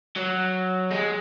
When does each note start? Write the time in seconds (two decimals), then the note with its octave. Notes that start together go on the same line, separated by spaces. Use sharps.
0.16 F#3
0.91 G#3